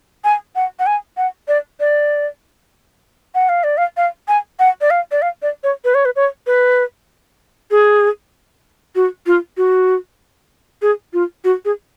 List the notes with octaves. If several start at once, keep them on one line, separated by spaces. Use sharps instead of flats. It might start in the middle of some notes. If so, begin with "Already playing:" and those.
G#5
F#5
F#5
G#5
F#5
D5
D5
F#5
F5
D5
F5
F5
G#5
F#5
D5
F5
D5
F5
D5
C#5
B4
C#5
B4
C#5
B4
G#4
F#4
F4
F#4
G#4
F4
F#4
G#4